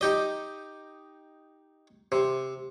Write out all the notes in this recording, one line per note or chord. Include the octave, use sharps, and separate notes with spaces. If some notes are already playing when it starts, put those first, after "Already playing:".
D#4 G4 D#5
C3